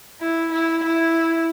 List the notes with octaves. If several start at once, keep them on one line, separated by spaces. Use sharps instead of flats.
E4
E4
E4